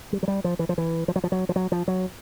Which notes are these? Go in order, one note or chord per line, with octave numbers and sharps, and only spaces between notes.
G3
F#3
G3
F3
E3
F3
E3
F3
F#3
F3
F#3
F3
F#3
F3
F#3